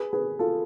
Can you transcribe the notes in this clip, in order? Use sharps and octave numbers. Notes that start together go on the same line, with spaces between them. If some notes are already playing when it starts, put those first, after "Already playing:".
Already playing: G#4 B4
G#4 B4
F4 A4